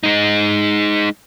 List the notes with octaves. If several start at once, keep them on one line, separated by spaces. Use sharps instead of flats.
G#3 D#4